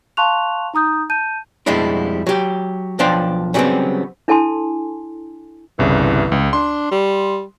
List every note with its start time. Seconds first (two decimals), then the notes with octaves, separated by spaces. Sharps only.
0.17 F5 A5 C6 C#6 F#6 F7
0.74 D#4 A#5 D#6 G6
1.10 A5 G6 D#7
1.66 F2 B2 G3 G#3 D4 E4
2.27 F#3 G4
2.99 B1 F3 D4 C5 G5
3.54 C#3 F#3 G3 A3 B3 C4
4.28 D4 E4 A4 G#5 A5 C6
5.79 G1 C2 C#3 E3
6.32 C#2
6.53 D4 C6
6.91 G3